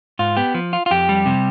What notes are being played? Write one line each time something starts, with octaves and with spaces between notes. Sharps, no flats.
G#2 F4
B3 G4
F3
F4
F4
F2 G4
G3
C3